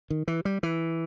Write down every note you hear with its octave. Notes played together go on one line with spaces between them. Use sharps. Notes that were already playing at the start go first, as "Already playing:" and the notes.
D#3
E3
G3
E3